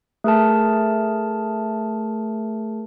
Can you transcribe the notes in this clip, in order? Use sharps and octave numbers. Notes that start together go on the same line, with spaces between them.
A3 G#4 A#4 A5